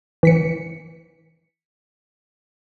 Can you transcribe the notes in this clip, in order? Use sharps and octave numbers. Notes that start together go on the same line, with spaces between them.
E3 B6 C#7